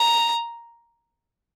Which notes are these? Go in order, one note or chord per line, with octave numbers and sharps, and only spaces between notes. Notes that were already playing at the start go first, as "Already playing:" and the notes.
Already playing: A#5